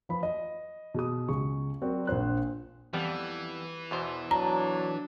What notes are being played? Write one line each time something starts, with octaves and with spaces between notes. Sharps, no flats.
F3 B4 B5
D#5
B2 G#4 D#6
C#2 G#4 C#6
F#3 C4 F#4 A#4 D5
A#1 F4 C5 F#6
F2 E3 G3 B3
E2 B2 C5
F#3 D4 A#5